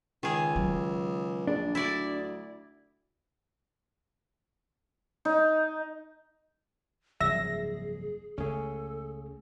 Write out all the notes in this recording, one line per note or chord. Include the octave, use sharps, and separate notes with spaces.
C#2 D#3 G#4
F#3
A#1 D4
D2 E4 D5
D#4
F#1 C2 G#2 F3 G#4 E5 A#6
C#2 A3 C#4 G#4 A4